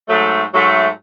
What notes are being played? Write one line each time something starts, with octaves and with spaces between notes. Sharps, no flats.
G#2 F#3 A3
G#2 F#3 A3